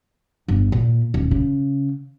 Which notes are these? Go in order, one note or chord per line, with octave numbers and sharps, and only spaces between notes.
G1
A#2
D#1
C#3